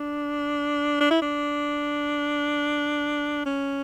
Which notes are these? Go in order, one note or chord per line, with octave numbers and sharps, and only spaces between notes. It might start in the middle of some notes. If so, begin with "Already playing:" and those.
Already playing: D4
D4
E4
D4
C#4